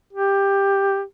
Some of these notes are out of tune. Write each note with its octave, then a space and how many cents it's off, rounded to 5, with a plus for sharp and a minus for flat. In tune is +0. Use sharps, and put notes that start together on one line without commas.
G4 +10